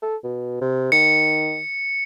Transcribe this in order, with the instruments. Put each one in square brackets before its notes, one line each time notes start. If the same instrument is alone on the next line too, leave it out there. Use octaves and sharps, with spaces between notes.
[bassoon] A4
B2
C3
[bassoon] D#3 [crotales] C#7